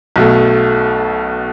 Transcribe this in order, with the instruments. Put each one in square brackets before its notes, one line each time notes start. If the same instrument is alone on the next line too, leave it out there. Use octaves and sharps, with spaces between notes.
[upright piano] B1 B2 A3